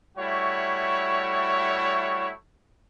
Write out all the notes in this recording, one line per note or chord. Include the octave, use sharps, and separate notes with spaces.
G3 A3 E4 F#4 C#5 C#6